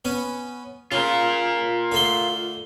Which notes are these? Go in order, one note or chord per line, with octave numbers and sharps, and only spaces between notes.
B3 C#4
C#3 F4 A#4
D3 A3 C6